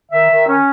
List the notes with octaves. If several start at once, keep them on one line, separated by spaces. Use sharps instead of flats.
D#3 E5
D#3
C#4